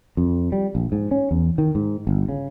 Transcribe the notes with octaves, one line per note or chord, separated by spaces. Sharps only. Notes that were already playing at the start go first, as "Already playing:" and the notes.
F2
G3
A#1
G#2
C#4
E2
D#3
G#2
G1
C#3